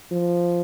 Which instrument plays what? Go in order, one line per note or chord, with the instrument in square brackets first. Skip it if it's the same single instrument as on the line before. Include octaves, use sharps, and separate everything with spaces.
[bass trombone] F3